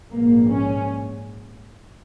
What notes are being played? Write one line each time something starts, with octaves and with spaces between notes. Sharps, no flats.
A#1 G#2 A#3
C#4